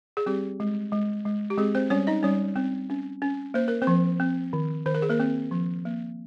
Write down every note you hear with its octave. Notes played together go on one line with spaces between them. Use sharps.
G#4
G3 C4 G4
G#3
G#3
G#3
G4
G#3 C4 G#4
C4 C5
G3 C#4 C#5
D#4 D#5
G3 C#4 C#5
C4
C#4
C#4
A#3 C5
A#4
C4 C5
F3
C4
D#3
D#3 C5
A#4
G#4
A#3 A#4
C4
F3
A#3